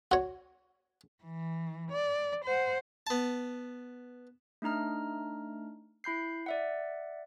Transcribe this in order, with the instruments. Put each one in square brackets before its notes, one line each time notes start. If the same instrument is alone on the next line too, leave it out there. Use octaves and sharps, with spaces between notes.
[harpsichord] F#4 C#5
[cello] E3
D5
C5 F#5
[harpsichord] B3 A5
[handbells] A3 D4 D#4 A#5 F6
E4 B5 G6 C7
D5 E5 F#5